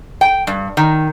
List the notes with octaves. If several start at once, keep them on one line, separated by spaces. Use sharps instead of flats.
G5
G2
D#3